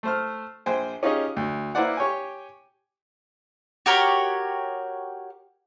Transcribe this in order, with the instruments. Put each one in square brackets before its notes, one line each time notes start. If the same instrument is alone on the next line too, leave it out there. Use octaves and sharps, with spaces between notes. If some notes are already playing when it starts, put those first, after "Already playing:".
[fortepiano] A3 C5 F6
A#1 C5 G5 G#5
C#4 D#4 F4 G4 G#4 D#5
D2
A#3 E4 B4 C5 D5 F#5
G4 C#5 G5 G#5
[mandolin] F#4 G4 A#4 C#5